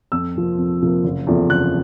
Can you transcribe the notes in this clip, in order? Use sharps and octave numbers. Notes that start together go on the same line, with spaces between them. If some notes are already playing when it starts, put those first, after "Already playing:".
F2 E6
C3 F3 A#3
F2
C3 F3 A#3
F#1
E2 C3 F3 A3
F#1 F#6